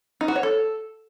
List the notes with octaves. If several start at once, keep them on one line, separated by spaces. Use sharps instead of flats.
D#4
F#4
C#5
A4